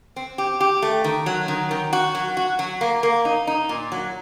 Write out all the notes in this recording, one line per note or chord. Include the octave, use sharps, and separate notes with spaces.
C4
G4
G4
A3
D#3
F#3
D#3
D#3
F#4
F#3
F#4
F#3
A#3
A#3
D#4
D#4
A#2
F#3